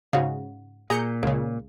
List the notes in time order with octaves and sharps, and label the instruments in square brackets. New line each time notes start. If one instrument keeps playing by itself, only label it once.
[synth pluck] G#2 C#3 [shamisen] F#4 F5
[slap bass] A#2 [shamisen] G#4 [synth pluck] A#5 G6 C#7
[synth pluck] C#2 C#3 [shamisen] A#3